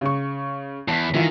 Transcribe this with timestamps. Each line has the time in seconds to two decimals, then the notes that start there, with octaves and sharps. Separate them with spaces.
0.01 C#3 C#6
0.88 E2 A5 B6
1.14 D#3 E3 E4 F4